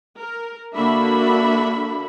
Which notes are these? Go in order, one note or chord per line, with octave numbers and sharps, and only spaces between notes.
A#4
D3 A#3 D4 F#4 E5 B5